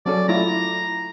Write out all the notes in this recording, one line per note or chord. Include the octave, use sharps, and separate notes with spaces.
F#3 C#4 A4 D5
A3 E4 F4 A#5